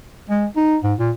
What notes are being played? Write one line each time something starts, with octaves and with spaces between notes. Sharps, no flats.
G#3
D#4
G#2
A#2